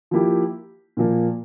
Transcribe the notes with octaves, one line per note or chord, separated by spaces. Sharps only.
F3 A#3 E4 G4
A#2 F3 A#3